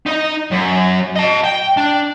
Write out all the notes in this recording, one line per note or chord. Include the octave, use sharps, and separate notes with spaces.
D#4 D#5
F#2
D#5 A5
G5
D4